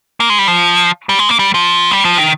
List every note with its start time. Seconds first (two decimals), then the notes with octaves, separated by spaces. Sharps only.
0.20 A#3
0.30 G#3
0.39 G3
0.48 F3
1.09 G3
1.19 G#3
1.29 A#3
1.39 G3
1.54 F3
1.91 G3
2.05 F3
2.18 D#3